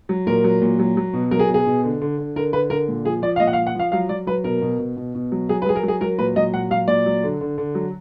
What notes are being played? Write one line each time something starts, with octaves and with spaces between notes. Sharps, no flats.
F#3
A#2 A#4
F#3
A#2
F#3
F#3
B2
F#3 A#4
G#4
B2
G#4
B2
D3
D3
D3
D3 A#4
D3 B4
D3 A#4
A#2
F3 G#4
F3 D5
F5
A#2 D#5
F#5
F5
F3
F#5
F3 F5
F#3 F5
F#3 D5
F#3 B4
B2 A#4
B2
B2
B2
B2
F#3
F#3 G#4
B4
F#3 G#4
A#4
F#3
G#4
F#3 A#4
A#2 B4
F#3 D#5
A#2 F#5
F#3 F5
A#2 D5
F#3
D3
D3
D3
F#3